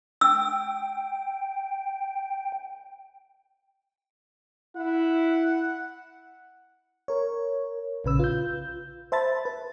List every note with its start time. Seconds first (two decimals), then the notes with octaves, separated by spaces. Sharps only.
0.21 G5 E6
4.76 E4 F#5
7.08 A#4 C#5
8.04 A#1 C#3 B4 E6
8.19 F4 G6
9.12 C5 E5 A5 B5 A6
9.45 B4